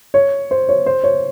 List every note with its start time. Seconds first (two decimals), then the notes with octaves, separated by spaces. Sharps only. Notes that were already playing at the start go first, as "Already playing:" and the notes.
0.14 C#5
0.51 C5
0.69 C#5
0.86 C5
1.04 C#5